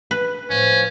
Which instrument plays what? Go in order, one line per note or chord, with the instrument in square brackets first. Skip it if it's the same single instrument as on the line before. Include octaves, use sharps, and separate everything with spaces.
[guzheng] B4
[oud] A2 F3 [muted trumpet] C#4